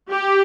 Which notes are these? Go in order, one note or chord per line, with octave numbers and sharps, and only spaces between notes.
G4